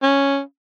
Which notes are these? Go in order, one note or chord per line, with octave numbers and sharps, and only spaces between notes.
C#4